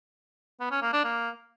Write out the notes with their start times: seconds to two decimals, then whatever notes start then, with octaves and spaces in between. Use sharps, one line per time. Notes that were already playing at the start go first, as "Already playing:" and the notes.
0.60 B3
0.71 C#4
0.82 A#3
0.93 D4
1.04 A#3